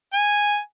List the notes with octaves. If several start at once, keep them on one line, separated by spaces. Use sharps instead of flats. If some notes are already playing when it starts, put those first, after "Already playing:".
G#5